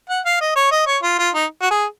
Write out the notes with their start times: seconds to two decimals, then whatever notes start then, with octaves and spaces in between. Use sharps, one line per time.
0.09 F#5
0.25 F5
0.41 D#5
0.56 C#5
0.71 D#5
0.87 C#5
1.03 F4
1.18 F4
1.34 D#4
1.62 F#4
1.71 G#4